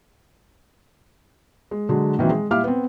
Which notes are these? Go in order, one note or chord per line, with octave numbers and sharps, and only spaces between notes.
G#3
D3 F#3 G#3
A#2 D#3 E3 F#3 C4
G#3
A#2 G3 E4 F5 D6 F6
B3 C4